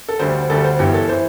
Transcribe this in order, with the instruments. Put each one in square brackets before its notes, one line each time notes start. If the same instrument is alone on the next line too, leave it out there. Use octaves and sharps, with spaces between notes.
[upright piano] A4
D2 D3 G3 C5
C5
D2 D3 G3 A4
C5
G1 G2 E3 G4
A4
E3 C5